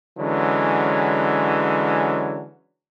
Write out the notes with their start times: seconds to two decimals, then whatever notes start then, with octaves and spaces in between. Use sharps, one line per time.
0.19 D3 E3 F#3 G#3 C#4